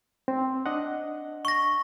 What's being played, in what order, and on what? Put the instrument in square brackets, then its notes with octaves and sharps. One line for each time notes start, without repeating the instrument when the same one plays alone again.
[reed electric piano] C4
D4 D#5 F#5
[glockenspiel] C#6 A#6